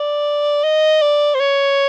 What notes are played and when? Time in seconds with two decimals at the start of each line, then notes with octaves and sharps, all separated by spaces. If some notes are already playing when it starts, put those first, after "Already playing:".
Already playing: D5
0.64 D#5
1.02 D5
1.34 C5
1.40 C#5